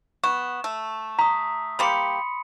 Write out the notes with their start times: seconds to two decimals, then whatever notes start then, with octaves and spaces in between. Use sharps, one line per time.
0.24 B3 C#6 E7
0.64 A3
1.19 A#5 D#6 B6
1.79 G3 A#3 G4 B5 C6 C#7